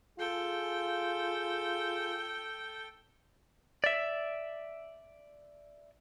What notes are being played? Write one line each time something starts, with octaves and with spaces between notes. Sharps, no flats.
F4 G#4 A4 G5
D5 E5